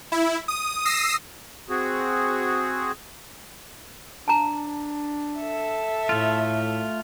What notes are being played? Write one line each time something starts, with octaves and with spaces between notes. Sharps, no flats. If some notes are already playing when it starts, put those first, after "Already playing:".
E4
D#6
D#6 E6 A#6 C7
C4 F#4 G#4
D4 A5 A#5
A4 E5
A2 A3 F4